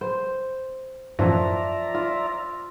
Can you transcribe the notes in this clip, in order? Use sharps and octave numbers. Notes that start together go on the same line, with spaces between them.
C5
F#2 A2 E3 F3 D5 E5 A#5
F4